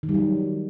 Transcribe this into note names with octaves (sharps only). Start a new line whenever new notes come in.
D#3
G3
F#3